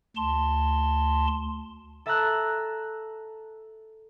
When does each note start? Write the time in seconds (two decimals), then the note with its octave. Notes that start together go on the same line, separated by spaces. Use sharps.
0.16 D2 A5 C6
2.06 A4 E5 A5 A#5 E6 F#6